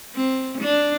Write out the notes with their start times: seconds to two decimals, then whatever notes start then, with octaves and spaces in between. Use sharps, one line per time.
0.16 C4
0.61 D4